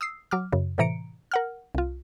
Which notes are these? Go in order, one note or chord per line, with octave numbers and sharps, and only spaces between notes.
D#6 E6 C7
F#3 D6 F6
F#2 C#3
A2 C3 E3 A#5 C#7 D7
A#4 F#5 F6
C2 F4